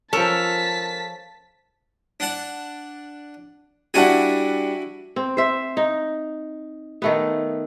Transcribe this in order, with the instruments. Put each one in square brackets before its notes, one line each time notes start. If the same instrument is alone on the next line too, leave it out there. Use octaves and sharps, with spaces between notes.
[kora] F3 C#4 [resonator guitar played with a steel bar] A4 A#4 [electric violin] A5 B6
[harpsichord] D4 F#5 A5
[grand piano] G3 D4 F#5 [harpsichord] E4 F#4 G#5
[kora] C4
C5 E5
D#4
D#3 A3 B3